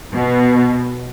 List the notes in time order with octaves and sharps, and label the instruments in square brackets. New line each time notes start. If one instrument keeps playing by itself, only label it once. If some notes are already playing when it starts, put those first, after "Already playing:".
[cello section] B2